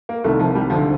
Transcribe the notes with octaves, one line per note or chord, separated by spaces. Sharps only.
A#3
C2 C3 D#3 A3
F3
G3
D2 D3 F3